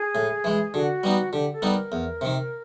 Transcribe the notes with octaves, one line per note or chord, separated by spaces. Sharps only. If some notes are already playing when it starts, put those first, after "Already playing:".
Already playing: G#4
A2
E3 G#3
D3 F#4
G3 B3 D#4
D3 G4
A4
G3 B3 D#4
A#4
E2
C3 D#3